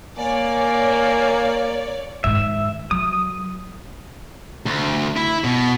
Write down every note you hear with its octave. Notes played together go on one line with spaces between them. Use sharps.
A#3 C#5 D5 G#5
G#2 D#3 E5
F#3 D#6
D2
E4
B2